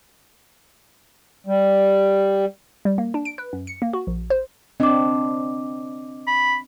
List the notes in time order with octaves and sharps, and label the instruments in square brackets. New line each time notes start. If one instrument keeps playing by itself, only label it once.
[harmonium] G3
[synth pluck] G3
A#3
D4
D7
B4
F#2
C#7
A#3
F#4
A#1
C5
[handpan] C4 D4 [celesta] D#5 D6
[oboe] B5